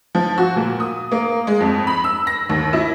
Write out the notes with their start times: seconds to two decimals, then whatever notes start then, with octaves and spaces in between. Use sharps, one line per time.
0.15 F3
0.38 F#4
0.56 A#2
0.80 D#6
1.11 A#3
1.47 G#3
1.61 F2
1.87 B5
2.04 E6
2.27 A#6
2.49 D#2
2.73 E4